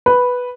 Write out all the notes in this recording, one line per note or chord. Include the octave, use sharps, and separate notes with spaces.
B4